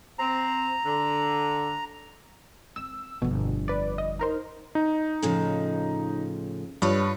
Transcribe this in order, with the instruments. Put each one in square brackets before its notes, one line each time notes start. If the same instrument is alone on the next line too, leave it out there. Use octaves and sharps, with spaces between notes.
[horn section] C4 [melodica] A#5
[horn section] D3
[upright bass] C4 [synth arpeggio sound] E6
[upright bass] G1 F2 [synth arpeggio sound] B2
[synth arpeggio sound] B4 D5
D#5
D#4 A#4 C5
[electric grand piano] D#4
[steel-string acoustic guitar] A2 C#3 F3
[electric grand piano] G2 [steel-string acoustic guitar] F4 B4 C#5